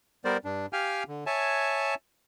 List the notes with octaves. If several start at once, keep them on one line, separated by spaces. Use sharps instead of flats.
G3 B3 A#4 C5 D5
G2 D4
G4 F5 G5 G#5 F6
D3
C#5 E5 G#5 A5